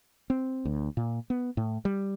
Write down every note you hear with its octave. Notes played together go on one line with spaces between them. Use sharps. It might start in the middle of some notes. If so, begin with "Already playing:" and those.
C4
D2
A#2
B3
A2
G3